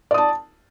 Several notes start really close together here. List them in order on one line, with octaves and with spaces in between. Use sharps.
D5 D#6 A5